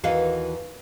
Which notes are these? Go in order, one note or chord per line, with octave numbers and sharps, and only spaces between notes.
D#2 E3 F#4 B4 D#5 F5